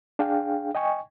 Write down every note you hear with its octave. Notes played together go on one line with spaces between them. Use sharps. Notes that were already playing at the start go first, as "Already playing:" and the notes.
D4 G#4 F5 G5
D#5 G5 G#5 C#6